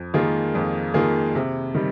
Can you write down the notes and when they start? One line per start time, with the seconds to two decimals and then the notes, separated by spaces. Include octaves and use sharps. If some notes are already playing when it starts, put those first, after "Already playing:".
Already playing: F2
0.14 D#3 A#3 F4 G#4
0.55 F2
0.94 D#3 A#3 F4 G#4
1.35 C3
1.75 D#3 G3